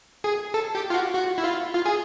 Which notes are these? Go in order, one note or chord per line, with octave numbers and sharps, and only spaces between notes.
G#4
A4
G4
F4
F#4
F#4
E4
F4
F4
G#4